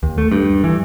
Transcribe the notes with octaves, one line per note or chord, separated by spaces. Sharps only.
D#2
A3
G2
E3